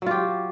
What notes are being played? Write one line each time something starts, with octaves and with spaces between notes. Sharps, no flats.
F#3 F4 G4